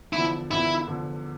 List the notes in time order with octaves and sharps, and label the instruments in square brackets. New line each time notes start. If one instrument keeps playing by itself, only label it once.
[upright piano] E2 D3 F3 [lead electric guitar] E4
[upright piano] E2 D3 F3 [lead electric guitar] E4
[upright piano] E2 D3 F3